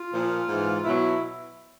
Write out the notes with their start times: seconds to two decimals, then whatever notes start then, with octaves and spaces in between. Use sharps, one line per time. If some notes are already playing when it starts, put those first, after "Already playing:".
Already playing: F4
0.12 A#2 F3
0.48 G#2 E3
0.84 B2 F#3 E4